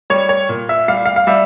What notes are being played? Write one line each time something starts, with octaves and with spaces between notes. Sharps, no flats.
G3 C#5
C#5
A#2
E5
G3 F5
F5
F5
G3 E5